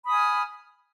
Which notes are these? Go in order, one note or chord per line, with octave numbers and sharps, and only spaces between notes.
G#5 B5 D#6 F6